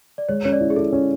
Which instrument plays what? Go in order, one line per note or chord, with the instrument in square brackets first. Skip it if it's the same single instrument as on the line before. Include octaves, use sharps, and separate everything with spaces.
[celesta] D5
[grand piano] G#3 [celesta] C#5
[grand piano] C#4 [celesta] C#5
[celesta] D5
[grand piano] E4
[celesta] G#4
[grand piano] E4 [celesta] A4
[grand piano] C#4